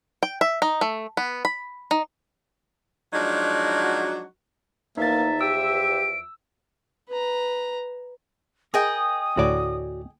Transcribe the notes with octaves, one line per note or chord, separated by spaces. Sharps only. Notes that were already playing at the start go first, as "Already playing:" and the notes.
G5
E5
D#4
A3
B3
B5
D#4
F3 F#3 G#3 D4 D#4 F#4
E2 F3 A#3 D#4 E5 A6
G4 E6 D7
B4 A#5
G#4 A#4 D#5 G5 D#6
D2 A2 F#4 C#5 D5